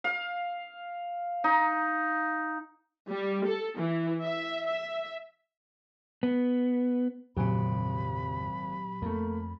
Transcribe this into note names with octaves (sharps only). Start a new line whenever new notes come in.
F5
D#4
G3
A4
E3
E5
E5
B3
G#1 F2 A#2 C#3 F#3 G4 G#5 B5
F2 A3 A#3